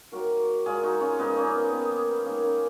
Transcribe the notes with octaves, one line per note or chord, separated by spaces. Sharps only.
D#3 F#3 A#3 F#4 A#4
A#2 G#3 F4 G#4
D#4 F#4
C#4 F4
A#2 F3 G#3 B3 D#4
A#3 C#4
B3
D#3 A#3 B3
A#3
B3
D#3 G#3 A#3 C#4
A#3 C#4